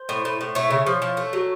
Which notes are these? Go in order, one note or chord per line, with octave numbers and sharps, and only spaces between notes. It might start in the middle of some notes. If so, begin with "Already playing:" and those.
Already playing: C5
A2
A2
A2
A3 C#5
C#3
F3
F3
A3
F#3